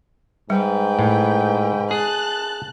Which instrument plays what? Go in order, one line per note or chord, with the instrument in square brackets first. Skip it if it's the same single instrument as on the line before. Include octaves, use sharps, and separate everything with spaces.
[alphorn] G#2 [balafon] G3 [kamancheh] B4 G5
[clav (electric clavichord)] A2
[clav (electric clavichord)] G#4 [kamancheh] A5 F#6